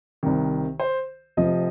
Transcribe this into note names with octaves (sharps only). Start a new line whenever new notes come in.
C2 C3 D#3
C5
F1 F2 C3 F3 D#5